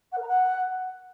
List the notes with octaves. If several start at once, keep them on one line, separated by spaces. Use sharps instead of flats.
F#5
A#4
A#5
F#5